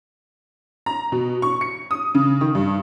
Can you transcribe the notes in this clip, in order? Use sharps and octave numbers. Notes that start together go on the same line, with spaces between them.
A#5
B2
C#6
C#7
D#6
C#3
D#3
G2